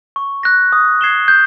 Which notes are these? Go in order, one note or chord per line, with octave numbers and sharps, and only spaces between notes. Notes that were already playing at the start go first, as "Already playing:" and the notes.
C#6
F#6 A#6
D#6
G#6 C7 E7 G7
G6